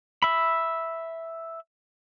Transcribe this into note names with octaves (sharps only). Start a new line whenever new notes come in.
E5 B5